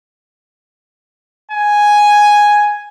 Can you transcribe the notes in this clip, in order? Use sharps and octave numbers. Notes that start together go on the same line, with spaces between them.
G#5